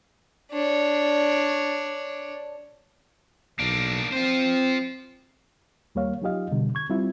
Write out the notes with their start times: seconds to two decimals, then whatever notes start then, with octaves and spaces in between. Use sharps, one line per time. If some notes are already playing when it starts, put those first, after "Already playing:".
0.52 D4 C#5
3.59 B1 A#3 D4
4.12 C4 F4 C5
5.95 D#2 G3 A#3 C#5 F5
6.22 F#3 D#4 F4 G4 D#5 F5
6.51 B2 D3 G3
6.75 C#6 G#6
6.90 G3 C4 E4 F4